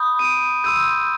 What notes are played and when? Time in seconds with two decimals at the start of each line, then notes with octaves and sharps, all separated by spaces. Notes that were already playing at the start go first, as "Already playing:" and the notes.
Already playing: B5 D#6 G6
0.19 D#7
0.25 D7
0.64 C6 E6 G6 D#7